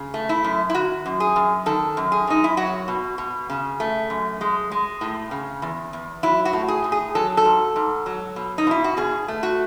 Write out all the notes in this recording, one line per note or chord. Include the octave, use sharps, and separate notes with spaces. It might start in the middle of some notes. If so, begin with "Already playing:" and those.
Already playing: C#3
A3
E4
F#2
E4
D#3 F#4
F#2
G#4
F#2
D#3 A4
F#2
G#4
F#2 D#4
E4
F#3 F#4
B2
B2
C#3
A3
F#2
G#3
G#3
A2
C#3
E2
E2
F#3 E4
F#4
A2
G#4
A2
G#4
F#3 A4
A4
G#2
G#2
F#3
B2
D#4
B2 E4
F#4
B2 G#4
A3
F#4